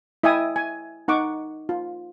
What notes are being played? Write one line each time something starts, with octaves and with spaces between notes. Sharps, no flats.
E4 D#5 E5 G5 G#5 D#6
G#5
D#4 F#5 C#6 D6
F4